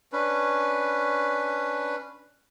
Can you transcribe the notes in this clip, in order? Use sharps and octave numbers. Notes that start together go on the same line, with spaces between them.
C#4 D4 B4